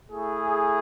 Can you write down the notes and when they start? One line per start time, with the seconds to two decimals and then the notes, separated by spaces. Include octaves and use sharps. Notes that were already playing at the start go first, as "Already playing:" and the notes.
0.10 A3 E4 G#4